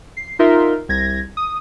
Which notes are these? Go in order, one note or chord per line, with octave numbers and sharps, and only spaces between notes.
C7
D#4 F4 A#4 E5 C6
C2 G#6 A#6
D#6